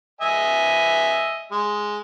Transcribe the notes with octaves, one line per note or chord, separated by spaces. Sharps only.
D#5 E5 G#5
G#3